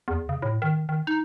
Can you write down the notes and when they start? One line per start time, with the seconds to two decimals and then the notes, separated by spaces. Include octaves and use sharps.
0.08 E2
0.29 C#3
0.42 A2
0.62 D#3
0.89 D#3
1.07 D#4